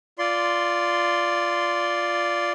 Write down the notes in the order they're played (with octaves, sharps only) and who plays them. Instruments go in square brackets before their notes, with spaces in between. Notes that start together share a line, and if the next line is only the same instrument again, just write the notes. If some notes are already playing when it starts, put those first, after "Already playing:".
[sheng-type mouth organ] F4 D5 C6